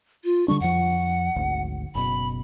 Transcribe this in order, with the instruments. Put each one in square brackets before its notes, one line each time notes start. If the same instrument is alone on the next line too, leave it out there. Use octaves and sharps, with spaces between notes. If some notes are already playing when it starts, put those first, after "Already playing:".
[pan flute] F4
[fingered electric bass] D3 G3 D4 [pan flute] C#6
[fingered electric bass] F2 F3 [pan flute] F#5
[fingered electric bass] G#1 D2
[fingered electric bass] F#1 B2 [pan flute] B5